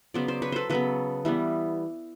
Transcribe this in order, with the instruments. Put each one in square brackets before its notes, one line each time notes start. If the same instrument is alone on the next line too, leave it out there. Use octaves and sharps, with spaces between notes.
[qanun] C#3 F#3 B3 C5 D5
C5 D5
B4 C#5
A4 B4 C5
C#3 F#3 B3 A4 B4
E3 G3 B3